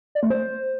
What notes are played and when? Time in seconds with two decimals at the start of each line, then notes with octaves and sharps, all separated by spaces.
0.15 D5
0.23 A3
0.30 C5